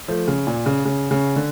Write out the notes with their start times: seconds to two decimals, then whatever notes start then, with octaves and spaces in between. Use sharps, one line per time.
0.08 F3 A3
0.28 C#3
0.47 A#2
0.66 C#3
0.85 C#3
1.11 C#3
1.36 D3